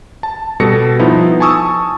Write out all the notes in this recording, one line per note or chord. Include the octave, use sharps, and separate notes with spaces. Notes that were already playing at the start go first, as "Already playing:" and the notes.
A5
B2 G3 A4 A#6 C#7
F3 B3 D#4 E4
G#5 A5 C#6 D#6 E6